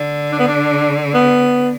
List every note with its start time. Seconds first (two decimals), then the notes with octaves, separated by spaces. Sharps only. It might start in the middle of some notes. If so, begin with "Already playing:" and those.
Already playing: D3
0.32 D4
0.39 B3
0.48 D4
1.14 B3